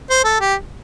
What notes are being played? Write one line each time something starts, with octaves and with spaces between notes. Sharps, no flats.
C5
A4
G4